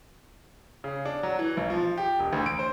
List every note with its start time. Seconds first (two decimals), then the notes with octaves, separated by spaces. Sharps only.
0.84 C#3
1.05 D4
1.23 F#3
1.39 E3
1.57 B1
1.70 F3
1.98 G4
2.19 E1
2.33 D2
2.46 D7
2.59 C5